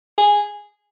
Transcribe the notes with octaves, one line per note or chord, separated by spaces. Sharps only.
G#4